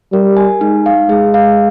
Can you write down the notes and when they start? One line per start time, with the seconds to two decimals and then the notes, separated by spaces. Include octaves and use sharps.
0.13 G3 A#4
0.37 G#5
0.61 G#3 D#4
0.86 F5
1.09 G#3 G#4
1.34 F5